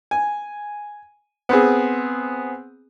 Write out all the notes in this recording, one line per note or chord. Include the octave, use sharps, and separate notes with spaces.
G#5
B3 C4 G#4